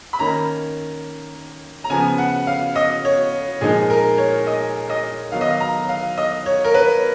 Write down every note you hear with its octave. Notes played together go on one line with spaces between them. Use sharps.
B5
D#3 A#3 C#4 A#5
A#5
C#3 F3 B3 G#5
F#5
F5
D#5
C#5
A#2 F3 G#3 D#4 G#4
A#4
C#5
D#5
D#5
D#3 F#3 B3 D#4 F5
D#5
F5
A#5
F5
D#5
C#5
A#4
B4